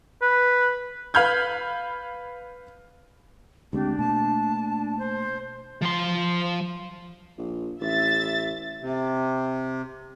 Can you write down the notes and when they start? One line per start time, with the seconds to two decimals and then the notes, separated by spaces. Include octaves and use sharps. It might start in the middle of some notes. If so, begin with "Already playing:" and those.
0.22 B4
1.14 B4 F5 B5 F6 G6 G#6
3.73 D2 G#3 C4 D4 G4
3.99 B2 A3 A#3 A5
4.99 C5
5.82 F3 C6
7.38 A#1
7.81 A1 E5 A6
8.81 C3